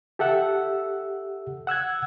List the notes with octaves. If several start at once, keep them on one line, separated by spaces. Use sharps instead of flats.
G4 A4 E5 F#5 E6
F#5 E6 F#6 G#6